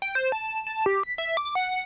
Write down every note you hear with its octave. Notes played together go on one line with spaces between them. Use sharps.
G5
C5
A5
A5
G4
B6
E5
D6
F#5